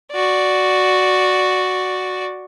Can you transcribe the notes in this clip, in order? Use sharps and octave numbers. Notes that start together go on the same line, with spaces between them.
F#4 D5